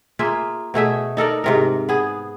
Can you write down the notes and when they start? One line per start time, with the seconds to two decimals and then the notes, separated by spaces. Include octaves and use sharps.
0.19 A#3 F4 G#4 E5
0.74 B2 A3 G#4 E5
1.17 D#4 A4 A#4 D5
1.44 G#2 C3 A#4
1.89 B3 G#4